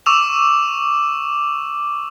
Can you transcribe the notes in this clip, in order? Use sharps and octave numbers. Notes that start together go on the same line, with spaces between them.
C#6 D6 E6 E7 F7